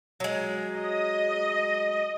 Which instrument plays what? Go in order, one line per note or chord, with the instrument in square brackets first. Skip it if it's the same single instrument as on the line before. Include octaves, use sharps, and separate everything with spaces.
[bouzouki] F#3 G#3
[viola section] D#5